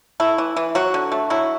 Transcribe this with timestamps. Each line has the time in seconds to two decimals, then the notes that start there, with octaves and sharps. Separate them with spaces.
0.20 A3 E4
0.38 E3
0.56 E3
0.75 F#3 F#4
0.94 D3
1.12 A3
1.30 F#3 E4